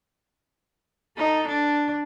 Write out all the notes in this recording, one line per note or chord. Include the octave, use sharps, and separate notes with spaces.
D#4 A4
D4